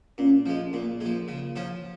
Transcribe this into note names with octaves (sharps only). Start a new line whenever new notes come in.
A#2 C#4
F3 G#3
A#2 A#3
F3 G#3
C#3
F3 C#4 F4